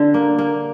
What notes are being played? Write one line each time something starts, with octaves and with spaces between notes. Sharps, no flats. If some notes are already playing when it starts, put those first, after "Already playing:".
Already playing: D3
A#3
A#3